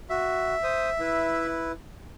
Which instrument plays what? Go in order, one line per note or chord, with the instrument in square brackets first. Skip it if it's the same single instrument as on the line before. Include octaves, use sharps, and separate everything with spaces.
[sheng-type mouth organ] F#4 [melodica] E5
[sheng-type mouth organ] C5 D#6
E4 B4